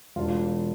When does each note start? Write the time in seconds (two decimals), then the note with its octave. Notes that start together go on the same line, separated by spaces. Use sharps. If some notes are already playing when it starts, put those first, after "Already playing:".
0.16 E1 F4